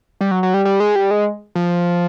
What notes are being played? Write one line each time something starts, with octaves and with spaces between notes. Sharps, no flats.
G3
F#3
F#3
G3
G3
G#3
G3
G#3
F3